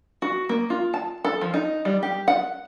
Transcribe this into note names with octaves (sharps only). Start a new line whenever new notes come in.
F#4
A#3
F4
A5
A4
F3
D#4
G3
G4
F#5